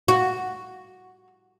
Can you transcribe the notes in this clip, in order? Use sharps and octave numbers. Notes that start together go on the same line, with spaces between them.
F#4